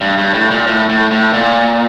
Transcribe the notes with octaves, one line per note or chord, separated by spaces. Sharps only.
G2
G2
A2
A#2
A2
A2
A2
A#2